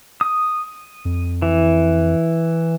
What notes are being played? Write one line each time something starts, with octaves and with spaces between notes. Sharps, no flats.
D#6
F2
E3